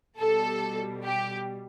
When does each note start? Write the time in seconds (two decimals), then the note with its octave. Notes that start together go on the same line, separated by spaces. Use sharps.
0.18 B2 G3 A4
1.04 G4